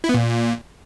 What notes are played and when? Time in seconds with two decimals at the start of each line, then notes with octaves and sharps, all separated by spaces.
0.04 E4
0.09 B3
0.14 A#2